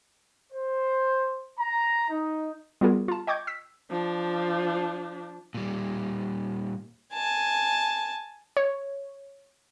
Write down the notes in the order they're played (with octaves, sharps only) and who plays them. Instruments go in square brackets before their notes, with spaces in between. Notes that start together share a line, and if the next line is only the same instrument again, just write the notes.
[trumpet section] C5
A#5
D#4
[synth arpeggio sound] G3 B3 F4 F#4 G#4 A#4
F4 A5
D#5 G5 C#6 D6 G6 G#6
E6 B6
[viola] F3 D4
[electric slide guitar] A#2 G3
[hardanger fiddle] G#5 A5
[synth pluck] C#5